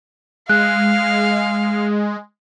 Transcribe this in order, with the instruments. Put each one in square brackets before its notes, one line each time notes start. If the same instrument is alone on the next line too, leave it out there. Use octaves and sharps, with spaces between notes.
[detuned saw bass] G#3 [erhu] F5 [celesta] F#6